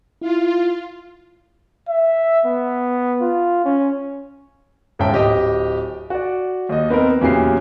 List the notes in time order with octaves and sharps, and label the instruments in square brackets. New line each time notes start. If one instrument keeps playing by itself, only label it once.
[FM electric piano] E4 [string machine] F4
[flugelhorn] E5
B3
F4
C#4
[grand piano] G1 G#2 C#4 E5 G5 A5
D1 G4 D#5
F#4 D5
D#2 D#5
B3 C4 D#4 A#4
E2 A#2 C#3 F#3 G4 C7